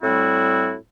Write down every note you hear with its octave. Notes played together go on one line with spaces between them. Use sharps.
A2 G3 C4 E4 F#4